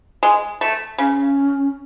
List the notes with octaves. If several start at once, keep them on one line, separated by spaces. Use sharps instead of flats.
G#3
A3
C#3 C#4